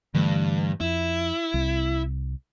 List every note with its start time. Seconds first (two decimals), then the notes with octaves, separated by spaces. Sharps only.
0.14 G2 D3 E3 A3
0.80 F2 E4
1.54 C2